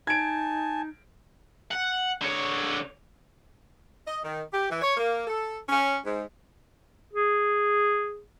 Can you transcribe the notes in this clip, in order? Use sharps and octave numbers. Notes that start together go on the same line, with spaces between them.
D#4 G#5 A5 G#6 D7
F#5
D3 C#5
D#5
D#3
G4
E3
C#5
A#3
A4
C#4
G#2
G#4